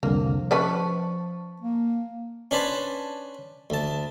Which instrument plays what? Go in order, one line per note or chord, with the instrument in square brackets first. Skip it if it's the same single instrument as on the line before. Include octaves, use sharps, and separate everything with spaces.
[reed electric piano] C2 F2 D3 [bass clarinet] F3 [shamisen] A#3
[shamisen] C#4 B4 D5 [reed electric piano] A5 C#6
[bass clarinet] A#3
[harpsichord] C#4 D4 B4 C5 A5
D2 A5